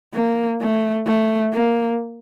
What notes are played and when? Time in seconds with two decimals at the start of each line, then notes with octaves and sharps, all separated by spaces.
0.14 A#3
0.60 A3
1.06 A3
1.53 A#3